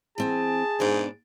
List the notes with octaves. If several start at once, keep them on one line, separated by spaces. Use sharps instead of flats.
E3 C4 G#4 G#5 A5
G#2 B2 B3 D4